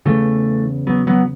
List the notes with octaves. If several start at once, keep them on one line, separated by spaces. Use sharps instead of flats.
E2 C#3 E3 A3
F#3 B3
F#3 B3